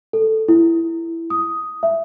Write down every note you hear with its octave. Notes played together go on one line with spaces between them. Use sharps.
A4
E4
D#6
E5